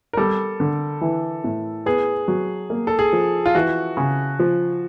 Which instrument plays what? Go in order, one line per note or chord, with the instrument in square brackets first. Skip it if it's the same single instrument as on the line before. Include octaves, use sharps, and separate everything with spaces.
[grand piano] A#4
[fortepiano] G3 [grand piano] A4
[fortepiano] D3
E3
A2
[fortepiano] B3 [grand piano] G#4
[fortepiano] F#3
A#3
[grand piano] A4
G#4
[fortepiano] F3
[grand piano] F4
[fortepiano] E3 [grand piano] F#4
[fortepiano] C#3
F3